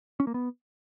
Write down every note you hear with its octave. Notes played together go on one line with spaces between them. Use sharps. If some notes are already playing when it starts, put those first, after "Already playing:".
C#4
A#3
B3